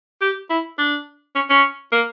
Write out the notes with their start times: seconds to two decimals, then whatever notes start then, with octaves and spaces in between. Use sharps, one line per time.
0.21 G4
0.50 E4
0.78 D4
1.36 C#4
1.50 C#4
1.92 A#3